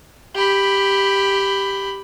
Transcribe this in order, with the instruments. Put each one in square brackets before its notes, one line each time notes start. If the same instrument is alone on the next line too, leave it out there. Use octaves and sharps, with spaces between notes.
[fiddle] G4 B5